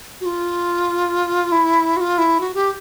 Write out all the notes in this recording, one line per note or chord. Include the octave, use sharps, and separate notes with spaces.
F#4
F4
E4
F#4
F4
E4
F#4
G4